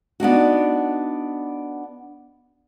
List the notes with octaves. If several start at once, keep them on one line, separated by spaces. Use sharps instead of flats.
B3 D4 D#4 F#4